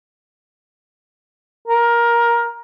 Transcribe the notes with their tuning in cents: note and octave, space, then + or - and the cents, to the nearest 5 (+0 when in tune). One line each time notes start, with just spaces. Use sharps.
A#4 +15